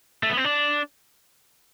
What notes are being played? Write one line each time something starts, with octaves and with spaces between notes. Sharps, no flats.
A3
B3
C4
D4